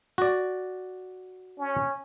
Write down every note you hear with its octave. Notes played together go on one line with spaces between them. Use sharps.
F#4 D5
C#4